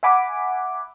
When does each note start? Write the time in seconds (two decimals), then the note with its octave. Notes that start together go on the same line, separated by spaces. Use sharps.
0.03 E5 F#5 G#5 B5 D6